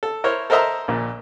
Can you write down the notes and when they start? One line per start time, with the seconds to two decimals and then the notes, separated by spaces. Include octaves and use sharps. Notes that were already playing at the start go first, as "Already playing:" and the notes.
0.03 A4
0.24 E4 A#4 C5 C#5
0.50 A4 A#4 C5 D#5 E5 A#5
0.88 A#1 A#2